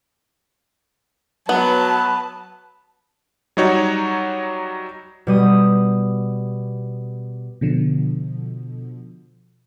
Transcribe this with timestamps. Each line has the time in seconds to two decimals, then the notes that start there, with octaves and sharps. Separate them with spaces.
1.49 F#3 B3 B4 A5
3.57 F#3 G3 D#4 F#4 C#5
5.27 B2 G3 D#6
7.61 B2 D3 F3